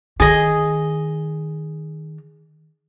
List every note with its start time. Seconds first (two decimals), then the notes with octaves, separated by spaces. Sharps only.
0.20 D#3 G#4 D#5